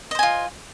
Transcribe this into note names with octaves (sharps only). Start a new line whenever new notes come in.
F4 C5 D#5 G#5